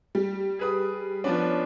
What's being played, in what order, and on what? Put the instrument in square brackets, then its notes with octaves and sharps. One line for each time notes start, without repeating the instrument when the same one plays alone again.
[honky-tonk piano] G3
[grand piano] G#4 B4 D#6
[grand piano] F3 B3 D4 [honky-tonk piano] C#4